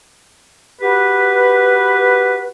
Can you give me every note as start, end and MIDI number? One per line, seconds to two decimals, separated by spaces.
0.82 2.46 66
0.82 2.46 67
0.82 2.46 71